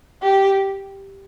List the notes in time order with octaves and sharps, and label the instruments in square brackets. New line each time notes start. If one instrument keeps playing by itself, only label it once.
[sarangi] G4